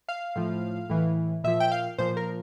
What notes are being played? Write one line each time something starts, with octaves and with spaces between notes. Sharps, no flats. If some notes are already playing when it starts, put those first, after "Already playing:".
F5
A2 F3
A2 E3
A#2 F3 E5
G5
F5
A#2 F3 C5
A#4